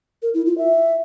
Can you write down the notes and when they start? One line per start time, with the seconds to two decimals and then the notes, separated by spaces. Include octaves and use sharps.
0.22 A#4
0.34 E4
0.46 F4
0.58 E5